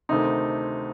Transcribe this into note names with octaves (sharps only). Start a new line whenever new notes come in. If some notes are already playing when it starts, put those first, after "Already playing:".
D2 C3 D#3 A3 C4 D#4